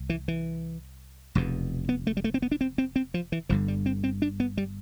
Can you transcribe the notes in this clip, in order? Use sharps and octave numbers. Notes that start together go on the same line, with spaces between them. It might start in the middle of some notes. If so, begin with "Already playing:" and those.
Already playing: C2
E3
E3
F1 E2 B2
B3
A3
G3
A3
C4
B3
D4
C4
C4
C4
F3
E3
G1 G2 D3 F3
G3
C4
C4
D4
B3
G3